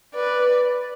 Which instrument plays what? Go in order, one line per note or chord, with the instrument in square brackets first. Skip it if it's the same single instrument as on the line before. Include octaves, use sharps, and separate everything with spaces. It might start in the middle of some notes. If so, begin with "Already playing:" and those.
[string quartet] B4 D5